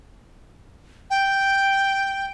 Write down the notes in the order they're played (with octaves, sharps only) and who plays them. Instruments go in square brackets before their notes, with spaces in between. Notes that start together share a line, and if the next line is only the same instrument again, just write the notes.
[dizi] G5